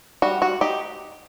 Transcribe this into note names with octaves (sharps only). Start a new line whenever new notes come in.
G3 F#4
F#4
D#4 G4